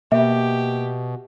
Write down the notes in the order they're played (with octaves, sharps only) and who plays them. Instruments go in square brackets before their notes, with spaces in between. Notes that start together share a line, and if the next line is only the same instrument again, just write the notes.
[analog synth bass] B2 [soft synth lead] A#3 [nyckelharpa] G4 [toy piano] E5